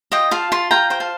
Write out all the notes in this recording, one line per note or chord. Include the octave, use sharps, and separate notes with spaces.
F4 D#5 G5
F4 F5 A5
F4 A5 C6
F4 G5 A#5
C5 G5
F5 A5